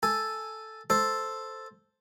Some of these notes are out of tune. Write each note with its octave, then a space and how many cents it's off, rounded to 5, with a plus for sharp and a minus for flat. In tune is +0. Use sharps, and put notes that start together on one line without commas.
A4 +0 G#5 +0
A4 +0 C5 +0